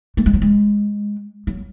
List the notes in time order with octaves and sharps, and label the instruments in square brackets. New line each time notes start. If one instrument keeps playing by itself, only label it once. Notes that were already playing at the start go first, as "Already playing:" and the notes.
[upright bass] A3
G#3
F#3
G#3
F#3